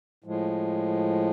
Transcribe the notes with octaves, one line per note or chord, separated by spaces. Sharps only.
A2 F3 G#3